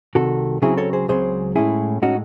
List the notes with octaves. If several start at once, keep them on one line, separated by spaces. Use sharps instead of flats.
C2 C3 D#3 F#4 A4
C#2 C#3 F#3 C4 E4 G#4
A4 C#5
G#4 C5
C#2 C#3 F#3 C4 G#4 C5
A2 G#3 C#4 E4 G#4
A2 G#3 C#4 D#4 F#4